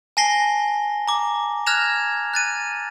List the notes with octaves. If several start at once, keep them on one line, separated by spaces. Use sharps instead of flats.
G#5 A5 A#6 C7 G7
A#5 D6
F6 F#6 G#6 A#6 E7 F7
F#6 A6 D#7